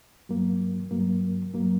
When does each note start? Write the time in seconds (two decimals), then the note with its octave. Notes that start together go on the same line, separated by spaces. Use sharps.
0.29 G2 F#3 A#3
0.91 G2 F#3 A#3
1.54 G2 F#3 A#3